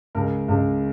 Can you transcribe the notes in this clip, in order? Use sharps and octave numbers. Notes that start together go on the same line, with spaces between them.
C#2 A#4
C#2